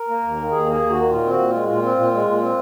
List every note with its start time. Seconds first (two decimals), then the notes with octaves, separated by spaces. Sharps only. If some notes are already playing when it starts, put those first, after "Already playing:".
Already playing: A#4
0.09 A#3
0.23 D#2
0.37 D#3
0.51 D#2 G#4
0.66 A#3
0.72 G#4
0.81 D#2
0.90 F#4
0.96 D#3
1.09 A#2 F4
1.25 C4 F#4
1.39 A#2
1.49 G#3 F4
1.68 A#2 F4
1.82 C4
1.97 A#2
2.13 G#3
2.26 A#2
2.41 C4